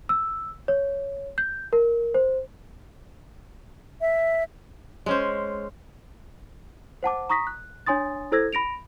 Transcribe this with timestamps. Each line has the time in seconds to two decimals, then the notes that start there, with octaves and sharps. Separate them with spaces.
0.09 E6
0.68 C#5
1.38 G6
1.73 A#4
2.14 C5
4.01 E5
5.06 G#3 C#4 C5
7.03 C5 F#5 A5 D6
7.29 A#5 C#6 D#6 A#6 B6
7.47 F#6
7.86 D4 C#5 G#5 C6 D#6 A6
8.32 E4 A4 C5 E6 G#6 A#6
8.53 B5 A#6 D7 F7